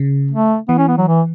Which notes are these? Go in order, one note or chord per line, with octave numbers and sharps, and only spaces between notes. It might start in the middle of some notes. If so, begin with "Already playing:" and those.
Already playing: C#3
A3
E3 B3
C#4
B3
F#3
E3